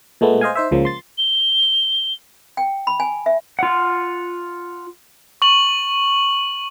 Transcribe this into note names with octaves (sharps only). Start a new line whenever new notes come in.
A#2 G#3 A3 B3
C5 D#5 F5 G#5
D#4 C5 E5
C#2 C#3 F3 A#3
C6 A6
G7
G5
B5
G#5
E5
F4 F#5
C#6 F#7